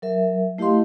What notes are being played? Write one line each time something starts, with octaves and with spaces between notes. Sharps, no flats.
F#3 A#4 E5
A3 E4 G4 D#5 F5 C6